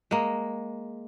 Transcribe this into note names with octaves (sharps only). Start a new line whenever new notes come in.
G#3 A#3